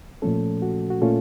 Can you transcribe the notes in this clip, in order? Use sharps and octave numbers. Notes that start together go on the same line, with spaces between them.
A#2 F3 A3 C#4 A4
F#4
F#4
A#2 A3 C#4 F4 A4